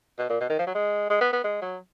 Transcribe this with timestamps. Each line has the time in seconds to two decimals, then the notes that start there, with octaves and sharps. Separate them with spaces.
0.18 B2
0.29 A#2
0.40 B2
0.49 D#3
0.59 F3
0.67 F#3
0.75 G#3
1.10 G#3
1.21 B3
1.33 B3
1.44 G#3
1.61 F#3